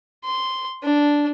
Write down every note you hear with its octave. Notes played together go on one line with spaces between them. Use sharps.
C6
D4